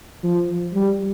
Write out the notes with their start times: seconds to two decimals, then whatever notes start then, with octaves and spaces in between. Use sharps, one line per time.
0.24 F3
0.74 G3